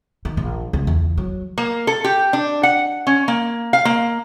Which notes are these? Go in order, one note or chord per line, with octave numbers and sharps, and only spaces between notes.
D#3
A#1
C#2
E2
F#3
A#3
A4
G4
D4
F#5
C#4
A#3
F5
A#3